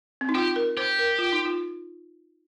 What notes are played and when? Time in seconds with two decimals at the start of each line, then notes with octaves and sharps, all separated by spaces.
0.21 C4
0.29 D#4
0.35 F4 G4
0.56 A#4
0.77 G4 C5
0.99 A#4
1.19 F4
1.33 D#4
1.45 F4